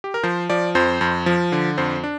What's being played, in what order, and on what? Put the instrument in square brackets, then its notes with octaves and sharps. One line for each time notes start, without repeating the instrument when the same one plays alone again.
[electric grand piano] G4
A#4
F3 C5
F3 D5
F2 C5
F2
F3
D3
F2 C5
D4